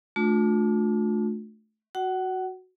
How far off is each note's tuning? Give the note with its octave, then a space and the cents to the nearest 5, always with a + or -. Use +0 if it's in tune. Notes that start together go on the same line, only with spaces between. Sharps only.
A3 -20 D4 +0 F4 +40
F#4 +0 F#5 +30